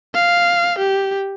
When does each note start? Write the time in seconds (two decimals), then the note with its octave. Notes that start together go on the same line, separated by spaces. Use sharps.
0.14 F5
0.78 G4